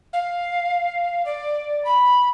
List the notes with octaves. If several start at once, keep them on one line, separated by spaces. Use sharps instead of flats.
F5
D5
B5